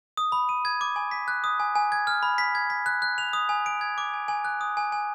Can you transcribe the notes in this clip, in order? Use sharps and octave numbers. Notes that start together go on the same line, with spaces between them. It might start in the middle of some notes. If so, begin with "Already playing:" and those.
D#6
B5
D#7
G#6
D6
G#5
B6
F#6
D#6
G#5
G#5
G#6
F6
B5
B6
G#6
B6
F#6
F#6
F7
D#6
G#5
D7
G#6
D6
G#5
G#5
F#6
D#6
G#5
G#5